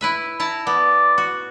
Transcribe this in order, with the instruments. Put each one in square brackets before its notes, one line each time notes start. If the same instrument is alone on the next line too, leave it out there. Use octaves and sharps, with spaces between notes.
[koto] E4 B4 E5
E4 A5 A#5
[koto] B3 [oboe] D5
[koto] F#4